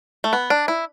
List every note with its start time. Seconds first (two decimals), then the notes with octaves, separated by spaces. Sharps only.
0.24 A3
0.33 B3
0.50 D4
0.68 E4